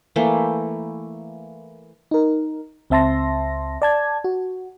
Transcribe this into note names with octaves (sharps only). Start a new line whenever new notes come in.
E3 A3 A#3 G5
D#4 A#4
C#2 C4 E5 A5 C6 A#6
D5 A5 G#6
F#4